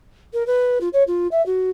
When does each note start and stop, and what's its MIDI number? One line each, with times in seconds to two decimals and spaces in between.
0.33 0.45 70
0.46 0.78 71
0.80 0.88 65
0.93 1.03 73
1.07 1.27 65
1.31 1.44 76
1.46 1.70 66